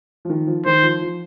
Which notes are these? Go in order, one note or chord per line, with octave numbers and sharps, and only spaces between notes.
F3
D#3
F3
D#3 C5
F3
F3